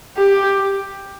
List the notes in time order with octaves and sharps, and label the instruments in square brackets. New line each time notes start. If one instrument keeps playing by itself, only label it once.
[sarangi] G4